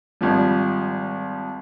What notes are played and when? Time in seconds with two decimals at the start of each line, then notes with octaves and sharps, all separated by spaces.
0.21 G#1 F3 G3